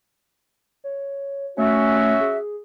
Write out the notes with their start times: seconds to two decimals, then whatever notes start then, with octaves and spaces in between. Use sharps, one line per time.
0.84 C#5
1.58 A3 C#4 F#4 E5
2.21 G#4